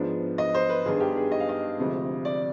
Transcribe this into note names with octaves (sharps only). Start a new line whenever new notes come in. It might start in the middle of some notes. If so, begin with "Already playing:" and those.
Already playing: G#2 F3 B3 D4
D#5
C5
B4
G2 D#3 B3 D4 G#4
G4
G#4
D#5
F5
D#5
D2 C3 F3 G#3
D5